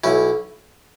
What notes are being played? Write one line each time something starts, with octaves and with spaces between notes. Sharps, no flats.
B1 C#4 E4